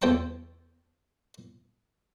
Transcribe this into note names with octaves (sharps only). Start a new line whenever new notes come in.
E2 C5 G5 A5 C#6